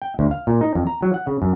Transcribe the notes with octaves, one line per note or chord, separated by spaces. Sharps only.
G5
D2
F5
A#2
D#4
F2
A#5
F#3
F#5
C#3
F#2